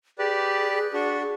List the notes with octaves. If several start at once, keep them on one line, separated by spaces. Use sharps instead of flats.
G4 G#4 B4 D5
D4 F#4